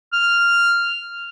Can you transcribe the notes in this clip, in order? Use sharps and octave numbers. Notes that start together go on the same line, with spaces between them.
F6